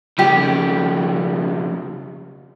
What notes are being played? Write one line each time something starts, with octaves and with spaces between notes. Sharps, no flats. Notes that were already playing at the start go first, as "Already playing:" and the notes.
F2 C#3 G4